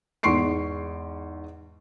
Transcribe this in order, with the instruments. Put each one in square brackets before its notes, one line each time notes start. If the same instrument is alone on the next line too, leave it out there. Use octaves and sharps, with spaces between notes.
[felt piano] E2 G#2 C6 C#6 C7 D7